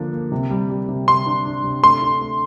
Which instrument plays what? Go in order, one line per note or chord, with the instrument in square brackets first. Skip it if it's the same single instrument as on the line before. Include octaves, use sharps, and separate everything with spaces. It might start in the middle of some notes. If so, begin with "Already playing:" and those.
Already playing: [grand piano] D3 F3 A#3 D4
A#3
C3
G3
G3
C3
[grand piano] C3 [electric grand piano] C6
[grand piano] D4
D4
C3
[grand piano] A3 [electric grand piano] C6
[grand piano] D4
A3